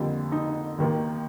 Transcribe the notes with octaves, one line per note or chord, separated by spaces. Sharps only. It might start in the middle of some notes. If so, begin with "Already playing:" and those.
Already playing: F2 D3 G3 A#3
D#4
D#2 D#3 A#3